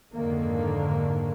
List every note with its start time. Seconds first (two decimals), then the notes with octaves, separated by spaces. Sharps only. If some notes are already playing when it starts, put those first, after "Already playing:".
0.14 F2 G#2 D3 D#3 A#3